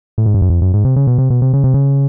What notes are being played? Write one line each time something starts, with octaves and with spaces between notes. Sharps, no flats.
A2
G#2
G2
F#2
F2
F#2
G#2
C3
C#3
B2
C3
B2
C3
C#3
C3
C#3